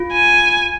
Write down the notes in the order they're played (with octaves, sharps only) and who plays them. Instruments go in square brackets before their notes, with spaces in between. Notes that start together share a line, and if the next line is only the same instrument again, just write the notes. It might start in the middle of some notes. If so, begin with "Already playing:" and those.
Already playing: [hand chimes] F4
[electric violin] G#5